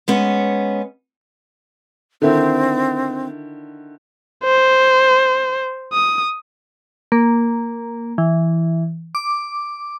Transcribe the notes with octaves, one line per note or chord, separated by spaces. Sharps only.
G#3 B3 C#4
D3 D#3 C4 E4
C5
D#6
A#3
E3
D6